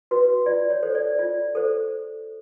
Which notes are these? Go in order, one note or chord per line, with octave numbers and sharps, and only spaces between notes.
F#4 B4
F4 D5
C#5
A4 C5
D5
F4 D5
A4 C5